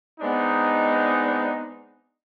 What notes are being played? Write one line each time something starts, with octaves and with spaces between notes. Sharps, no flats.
G#3 B3 C4 D4 D#4